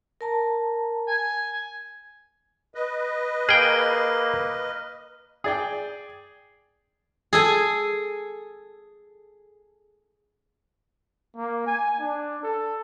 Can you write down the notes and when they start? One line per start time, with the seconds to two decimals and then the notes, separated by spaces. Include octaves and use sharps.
0.21 A#4 A5 A#5
1.08 G#5
2.75 B4 D#5
3.49 A#3 G#4 G5 F6
5.44 G#4 D5 G5
7.33 G#4 A4 G#5
11.37 A#3
11.67 G#5
12.00 D4
12.43 A4